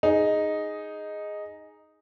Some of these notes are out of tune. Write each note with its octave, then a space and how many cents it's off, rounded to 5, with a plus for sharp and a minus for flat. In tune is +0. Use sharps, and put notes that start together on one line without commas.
D#4 +0 G#4 +5